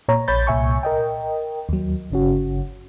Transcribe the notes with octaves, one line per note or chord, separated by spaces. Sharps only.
A#2 C#5 A#5
A#1 C#5 B5 G6 A6
C2 A#2 E5 G#5 C#6
A#4 D#5 G5
D#2 F#3
G1 C#3 C#4 F#4